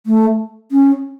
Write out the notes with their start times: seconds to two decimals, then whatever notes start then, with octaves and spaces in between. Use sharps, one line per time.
0.06 A3
0.72 C#4